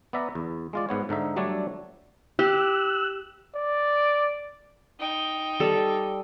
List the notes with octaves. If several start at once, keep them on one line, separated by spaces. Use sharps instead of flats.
B3 D5 E5 A#5
E2
G#3 F4 D5
G#2 B3 C#5
G#2 D3 D#4 E5
F#3 G3 A3 D4 A4 C#5
G4 E6 F#6
D5
D#4 G5
G3 A4